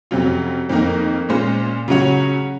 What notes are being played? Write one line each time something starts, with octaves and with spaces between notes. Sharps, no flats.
F2 C3 F#3 C#4 F4
F2 D#3 A#3 D#4 A#4
A#2 G#3 C#4 F4 C5
C#3 F#3 C#4 F#4 C#5